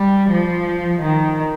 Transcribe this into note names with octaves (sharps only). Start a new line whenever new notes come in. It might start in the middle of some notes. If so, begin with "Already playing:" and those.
Already playing: G3
F3
D#3